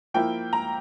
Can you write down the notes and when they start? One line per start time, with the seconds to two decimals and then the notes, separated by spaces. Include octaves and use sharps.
0.14 F3 A#3 E4 G5
0.53 A#5